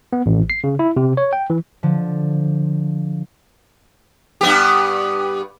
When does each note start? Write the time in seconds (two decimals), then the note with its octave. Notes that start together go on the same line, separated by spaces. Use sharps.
0.13 B3
0.26 A1
0.50 C7
0.64 C#3
0.79 E4
0.97 C3
1.17 C#5
1.33 G5
1.50 E3
1.83 D3 F3
4.41 G2 B3 G4